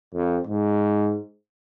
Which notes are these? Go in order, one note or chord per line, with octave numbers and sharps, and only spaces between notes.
F2
G#2